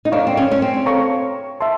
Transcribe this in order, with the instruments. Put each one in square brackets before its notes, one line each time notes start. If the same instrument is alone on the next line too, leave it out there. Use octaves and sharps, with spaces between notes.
[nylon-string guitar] D#4
[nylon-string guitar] D4 [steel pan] A4 C#5 F5 A#5 C#6
[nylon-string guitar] C4
C#4
C#4
C4
[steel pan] A4 C#5 F5 A#5 C#6
E5 A5 C6